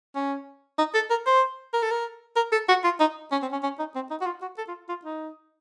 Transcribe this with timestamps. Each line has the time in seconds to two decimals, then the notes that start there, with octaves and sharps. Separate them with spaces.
0.15 C#4
0.78 D#4
0.94 A4
1.10 A#4
1.27 C5
1.74 A#4
1.83 A4
1.91 A#4
2.36 A#4
2.52 A4
2.69 F#4
2.84 F4
3.00 D#4
3.32 C#4
3.42 C4
3.52 C#4
3.63 C#4
3.79 D#4
3.95 C4
4.11 D#4
4.21 F#4
4.26 F4
4.42 F#4
4.58 A4
4.68 F4
4.89 F4
5.05 D#4